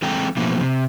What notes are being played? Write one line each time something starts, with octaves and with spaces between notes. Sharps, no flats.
E3 G#3 C4 A4 G5 A#5
B2 E3 F3 A3 A#3 C4
C3